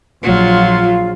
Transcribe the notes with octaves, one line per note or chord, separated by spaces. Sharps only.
A#1 F#3 F4